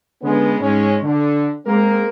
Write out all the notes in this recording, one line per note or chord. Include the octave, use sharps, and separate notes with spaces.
D3 G#3 B3 C#4
G#2 G#3 C#4
D3
G#3 A#3 C4 A#4